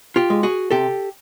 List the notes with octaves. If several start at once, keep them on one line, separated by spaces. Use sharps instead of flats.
F4 G4
G#3
F#4 G#4
C3 G4 A4